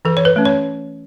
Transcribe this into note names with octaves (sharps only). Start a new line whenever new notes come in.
E3 A4
C#5
B4
A3 C#4
C#5